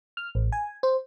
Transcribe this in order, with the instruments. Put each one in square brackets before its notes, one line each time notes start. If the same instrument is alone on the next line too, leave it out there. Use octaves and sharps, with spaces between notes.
[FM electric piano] F6
A1
G#5
C5